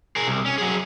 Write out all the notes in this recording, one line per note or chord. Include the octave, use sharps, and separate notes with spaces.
G#4 A#4
C2
C#4
F#3 G#4